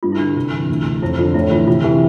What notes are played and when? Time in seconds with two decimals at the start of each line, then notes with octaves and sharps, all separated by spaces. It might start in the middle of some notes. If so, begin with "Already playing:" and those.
0.03 G2 F4
0.12 E4
0.19 D3 D4
0.36 C3
0.52 E3
0.69 D2
0.85 C3
1.02 F2 E4
1.18 D3 F4
1.34 A2 E4
1.51 E3 F4
1.67 C3 F4
1.84 E3 G4